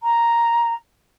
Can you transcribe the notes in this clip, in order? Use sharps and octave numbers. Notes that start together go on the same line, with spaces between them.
A#5